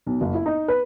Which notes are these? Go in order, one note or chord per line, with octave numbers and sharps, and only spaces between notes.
B1
F#1
E4
D#4
B4